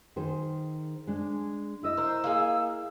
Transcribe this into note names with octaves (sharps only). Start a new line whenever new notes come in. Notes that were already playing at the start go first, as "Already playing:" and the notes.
D#3 G#4 C5
G#3 D4
E4 D#5 E6
A#4 C5
A#3 D#4 G#4